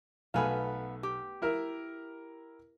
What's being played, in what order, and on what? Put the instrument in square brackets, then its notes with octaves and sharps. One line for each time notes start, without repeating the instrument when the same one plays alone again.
[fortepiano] B1 A3 G#5 [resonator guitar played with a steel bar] B3 B4 F5
[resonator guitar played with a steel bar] G4
[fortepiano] E4 A#4 E5